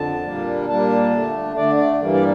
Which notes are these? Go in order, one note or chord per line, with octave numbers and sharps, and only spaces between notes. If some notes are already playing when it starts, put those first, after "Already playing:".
Already playing: F2 D3 A5
A#2 G3 A#3 D4
A#2 G3 A#3 D4 A5
D3 A3 D4
D3 A3 D4 D5
D5
G2 E3 G3 A#3
D5